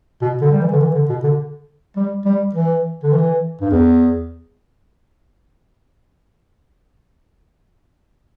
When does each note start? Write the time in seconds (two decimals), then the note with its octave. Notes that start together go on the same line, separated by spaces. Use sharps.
0.22 B2
0.41 D3
0.52 G3
0.61 E3
0.72 D3
0.80 E3
0.95 D3
1.09 B2
1.24 D3
1.96 G3
2.25 G3
2.55 E3
3.03 D3
3.12 E3
3.61 G2
3.71 E2